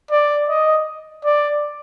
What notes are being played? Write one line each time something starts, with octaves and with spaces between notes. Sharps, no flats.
D5
D#5
D5